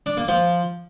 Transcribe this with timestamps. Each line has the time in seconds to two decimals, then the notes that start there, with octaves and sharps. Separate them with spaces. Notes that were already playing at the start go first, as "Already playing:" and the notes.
0.06 D4
0.17 A#3
0.28 F3